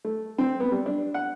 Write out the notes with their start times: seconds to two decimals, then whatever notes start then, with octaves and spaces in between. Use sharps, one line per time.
0.05 A3
0.38 C4
0.60 B3
0.72 G3
0.86 D4
1.14 F#5